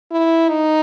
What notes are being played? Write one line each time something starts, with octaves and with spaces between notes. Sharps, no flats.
E4
D#4